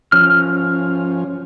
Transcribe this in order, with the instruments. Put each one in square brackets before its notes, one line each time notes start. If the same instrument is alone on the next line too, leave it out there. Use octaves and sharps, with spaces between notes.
[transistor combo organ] F3 C#4 [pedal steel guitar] F6